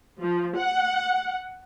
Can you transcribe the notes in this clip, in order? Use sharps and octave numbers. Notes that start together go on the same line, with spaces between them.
F3
F#5